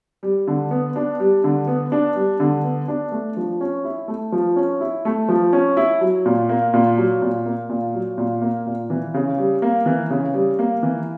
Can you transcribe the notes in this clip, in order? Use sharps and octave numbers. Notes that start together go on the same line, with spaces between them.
G3
D3
B3
D4
G3
D3
B3
D4
G3
D3
B3
D4
A3
F3
C#4
E4
A3
F3
C#4
E4
A3
F3
C#4
E4
F#3
A#2
A#3
A#2
F#3
A#2
A#3
A#2
F#3
A#2
A#3
A#2
E3
C#3
G3
A#3
E3
C#3
G3
A#3
E3